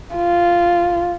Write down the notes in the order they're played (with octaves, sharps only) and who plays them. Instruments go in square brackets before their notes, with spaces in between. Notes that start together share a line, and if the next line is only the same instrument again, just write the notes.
[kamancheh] F4